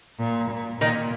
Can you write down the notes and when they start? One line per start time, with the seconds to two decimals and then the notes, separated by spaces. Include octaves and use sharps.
0.19 A#2
0.50 A#2
0.80 A#2 D#3